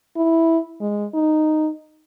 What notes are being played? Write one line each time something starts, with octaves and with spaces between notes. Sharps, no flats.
E4
G#3
D#4